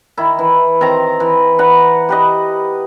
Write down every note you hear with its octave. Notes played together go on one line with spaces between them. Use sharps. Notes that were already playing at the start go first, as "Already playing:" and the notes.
D#3 E4
E3
D#3 C4 A#5
E3
B4 F#5 A#5
G4 B4 D#5